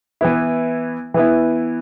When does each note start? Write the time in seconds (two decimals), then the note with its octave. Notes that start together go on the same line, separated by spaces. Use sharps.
0.21 E3 B3 E4
1.14 E3 B3 E4